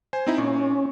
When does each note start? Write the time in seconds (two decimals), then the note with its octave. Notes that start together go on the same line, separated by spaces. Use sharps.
0.13 C5 G#5
0.27 C4 D#4 E4
0.38 A#2 C#4